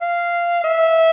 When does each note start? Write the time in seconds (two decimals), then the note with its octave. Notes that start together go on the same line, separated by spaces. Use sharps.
0.02 F5
0.64 E5